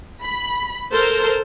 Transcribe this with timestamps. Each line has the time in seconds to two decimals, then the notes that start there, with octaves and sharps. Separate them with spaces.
0.22 B5
0.92 A4 A#4 C5